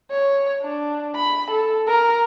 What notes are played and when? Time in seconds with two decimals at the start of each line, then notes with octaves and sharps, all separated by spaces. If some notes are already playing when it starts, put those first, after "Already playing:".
0.11 C#5
0.62 D4
1.15 B5
1.51 A4
1.87 A#4